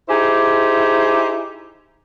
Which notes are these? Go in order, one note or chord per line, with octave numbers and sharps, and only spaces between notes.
D#4 E4 G4 G#4 C5